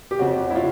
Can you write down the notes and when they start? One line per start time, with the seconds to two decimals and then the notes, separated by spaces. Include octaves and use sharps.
0.11 G4
0.19 F2 C#3 F#3 F#4
0.50 E4
0.55 F#3 F4